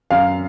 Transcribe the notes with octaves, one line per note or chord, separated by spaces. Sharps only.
F#2 F5